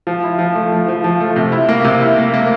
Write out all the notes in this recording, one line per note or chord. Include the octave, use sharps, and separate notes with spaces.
F3
E4
F3
A3
F3
F3
F3
A3
C3
E4
A#3
C3
E4
A#3
A#3